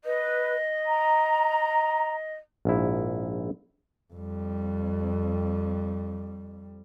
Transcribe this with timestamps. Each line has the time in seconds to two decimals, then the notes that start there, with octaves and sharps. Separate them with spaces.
0.04 B4 D#5
0.86 A#5
2.65 A#1 G#2 E4
4.14 F2 G3